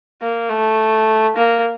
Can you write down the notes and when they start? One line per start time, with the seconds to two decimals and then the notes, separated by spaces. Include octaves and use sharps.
0.22 A#3
0.50 A3
1.36 A#3